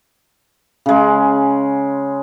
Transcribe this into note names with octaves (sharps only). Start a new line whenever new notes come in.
C#3 G#3